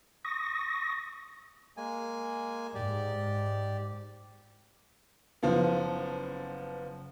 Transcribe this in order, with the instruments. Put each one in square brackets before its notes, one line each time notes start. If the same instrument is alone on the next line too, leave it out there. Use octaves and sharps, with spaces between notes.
[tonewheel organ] C#6 D#6 A#6
[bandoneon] G#3 A#3 G#5
[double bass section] G#2 [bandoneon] G4 D5
[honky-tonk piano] F#1 F3 B3